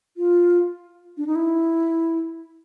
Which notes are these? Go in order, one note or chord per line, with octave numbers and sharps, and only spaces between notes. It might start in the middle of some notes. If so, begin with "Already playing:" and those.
F4
D4
D#4
E4